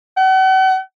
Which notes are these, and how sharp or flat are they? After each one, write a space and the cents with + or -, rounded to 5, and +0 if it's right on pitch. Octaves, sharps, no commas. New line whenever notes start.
F#5 +40